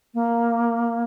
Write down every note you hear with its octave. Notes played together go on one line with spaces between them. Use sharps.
A#3